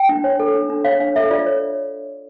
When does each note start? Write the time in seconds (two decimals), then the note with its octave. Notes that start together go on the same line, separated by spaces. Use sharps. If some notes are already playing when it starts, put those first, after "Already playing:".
Already playing: G5
0.09 D4
0.24 C#5
0.40 A4
0.54 D4
0.70 D4
0.84 C#5 F5
1.00 D4 F5
1.16 A4 E5
1.30 F4 D5
1.46 C#5